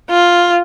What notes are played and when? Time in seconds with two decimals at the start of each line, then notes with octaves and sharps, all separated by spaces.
0.10 F4